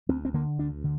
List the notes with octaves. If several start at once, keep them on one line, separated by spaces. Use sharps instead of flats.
D2 C4
C4
D3 A#3
D2 D4
D3